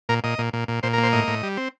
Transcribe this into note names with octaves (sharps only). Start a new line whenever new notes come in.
A#2 A#4
A#2 D#5
A#2
A#2
A#2
A#2 C5
A#4
A#3
C5
A2 D#5
A2
G3
C4